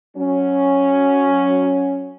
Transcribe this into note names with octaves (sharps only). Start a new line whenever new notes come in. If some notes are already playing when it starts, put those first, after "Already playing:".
F#3 C#4